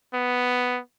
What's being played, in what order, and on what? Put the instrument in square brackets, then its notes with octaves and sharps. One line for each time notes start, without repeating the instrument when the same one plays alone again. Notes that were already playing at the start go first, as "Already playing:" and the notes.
[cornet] B3